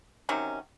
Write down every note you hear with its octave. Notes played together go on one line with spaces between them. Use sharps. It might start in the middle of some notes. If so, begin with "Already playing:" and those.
C3 D#3 F#3 C#4